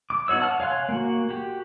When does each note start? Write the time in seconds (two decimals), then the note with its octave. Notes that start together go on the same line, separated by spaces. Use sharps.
0.10 D6
0.28 B3 D#4 F#4 C#5 E6
0.40 F#5 A5 F6
0.60 C#5 F5 G#5 C6 F#6
0.89 A#3 F#4
1.29 F#4 G4